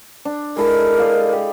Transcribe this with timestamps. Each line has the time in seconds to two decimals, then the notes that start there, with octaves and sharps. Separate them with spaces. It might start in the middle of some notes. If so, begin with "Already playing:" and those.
0.25 D4
0.57 G#3 E4 A4 A#4
0.98 D5 D#5 F5
1.33 G4